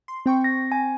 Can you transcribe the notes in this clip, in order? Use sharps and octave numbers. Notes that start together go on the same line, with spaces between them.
C6
C4 G5 C#6
A#6
G#5